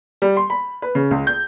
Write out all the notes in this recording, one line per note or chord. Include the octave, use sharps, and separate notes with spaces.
G3
C6
B5
B4
C#3
C#2
G6